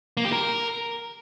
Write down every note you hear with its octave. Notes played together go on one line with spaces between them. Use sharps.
A#3
G4
A#4